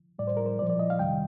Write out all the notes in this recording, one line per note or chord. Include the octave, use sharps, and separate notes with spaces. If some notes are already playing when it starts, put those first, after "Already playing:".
A2 G3 D5
C5
A#4
C5
A#2 F3 D5
D5
D#5
F5
F2 C3 D#3 G3 G5